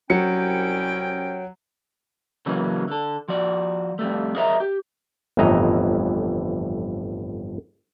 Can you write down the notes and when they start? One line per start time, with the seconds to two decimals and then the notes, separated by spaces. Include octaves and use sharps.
0.10 C2 F#3 C#4 G5 C#7
2.46 C#3 E3 F#3 G#3 A#3 C#4
2.88 D3 A4
3.28 F3 F#4 D5
3.99 F2 G3 A3
4.36 G#4 A#4 C#5 D#5 E5 A#5
4.60 G4
5.37 G1 F2 A2 E3 D#5 A#5